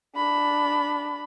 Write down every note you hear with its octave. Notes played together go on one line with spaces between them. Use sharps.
D4 B5